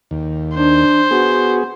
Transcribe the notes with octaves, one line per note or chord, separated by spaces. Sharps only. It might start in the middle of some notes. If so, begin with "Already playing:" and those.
D#2
D4 C5
B3 F#4 G#4